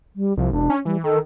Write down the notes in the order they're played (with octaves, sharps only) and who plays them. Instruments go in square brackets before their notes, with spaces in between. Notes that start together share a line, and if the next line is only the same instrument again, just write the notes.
[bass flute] G3
[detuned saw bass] C2 [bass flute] F3
[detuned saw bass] E1 [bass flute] D4
[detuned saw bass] C#4
[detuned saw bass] E3 [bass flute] G3
[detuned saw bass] D#3 [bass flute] A4